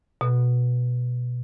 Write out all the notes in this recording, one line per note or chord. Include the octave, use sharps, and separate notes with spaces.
B2